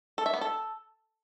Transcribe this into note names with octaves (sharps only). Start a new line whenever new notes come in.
A4
E5
B3
A4